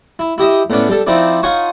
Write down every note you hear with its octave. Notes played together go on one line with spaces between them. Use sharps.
E4
E4 G4 D#5 E5
A2 B3 C#4 D4
G3 A4
F3 C4 D#4 E4 D5
D#4 F4 C#5 F#5 G#5 C#6